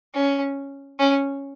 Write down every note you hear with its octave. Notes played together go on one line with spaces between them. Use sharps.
C#4
C#4